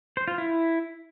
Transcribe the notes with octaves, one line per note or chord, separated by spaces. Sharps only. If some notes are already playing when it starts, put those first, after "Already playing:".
C5
F4
E4